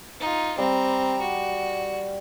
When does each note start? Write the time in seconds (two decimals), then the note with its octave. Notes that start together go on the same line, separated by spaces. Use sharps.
0.20 D#4 F4
0.58 G3 C4 A#5
1.21 F#4